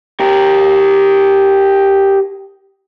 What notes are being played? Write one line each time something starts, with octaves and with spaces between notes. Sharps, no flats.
G4 A#4